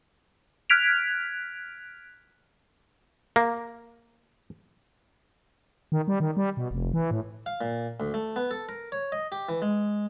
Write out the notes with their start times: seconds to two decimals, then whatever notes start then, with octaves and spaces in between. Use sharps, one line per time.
0.70 F6 F#6 G#6 B6 D7 F7
3.36 A#3
5.92 D#3
6.08 G3
6.20 D#3
6.37 G3
6.57 B2
6.71 F1
6.93 E3
7.11 A2
7.46 F5
7.61 A#2
8.00 D2
8.14 A3
8.36 B3
8.51 A4
8.69 A#4
8.92 C#5
9.12 D#5
9.32 G4
9.49 E3
9.62 G#3